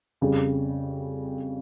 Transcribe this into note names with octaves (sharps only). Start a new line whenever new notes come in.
F2 C#3 G3